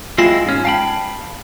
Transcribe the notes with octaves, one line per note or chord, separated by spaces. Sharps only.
G#3 C4 E4 F4
G#2 C#4
F5 G5 A5 B5